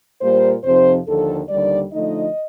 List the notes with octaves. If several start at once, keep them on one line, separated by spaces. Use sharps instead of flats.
A#2 G3 A#3 C5
F2 C3 F3 C4 D#4 C5
D#2 D3 F3 A4
D#2 D3 G3 D5
D3 F3 A3 D#4 D#5